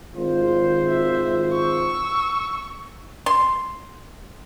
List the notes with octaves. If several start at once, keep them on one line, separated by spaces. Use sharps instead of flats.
G#1 F4 C5
E5
C#6 E6
C6